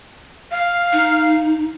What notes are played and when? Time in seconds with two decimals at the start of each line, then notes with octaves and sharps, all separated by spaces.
0.51 F5
0.92 D#4